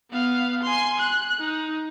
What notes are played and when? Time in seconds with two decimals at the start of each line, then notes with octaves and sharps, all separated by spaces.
0.11 B3 F5
0.63 G#5 C6
1.00 F#6
1.39 D#4